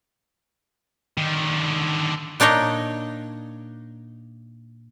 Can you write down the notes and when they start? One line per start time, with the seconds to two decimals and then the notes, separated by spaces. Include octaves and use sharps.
1.18 D3 D#3
2.40 A#2 D4 D#4 C#5 D#5